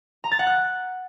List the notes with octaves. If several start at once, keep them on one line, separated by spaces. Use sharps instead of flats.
A#5
A6
F#5
F#6